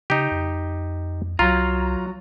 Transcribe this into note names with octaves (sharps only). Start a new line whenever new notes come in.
C#3 D#4 G4
F2
C2 F#3 F4 A#5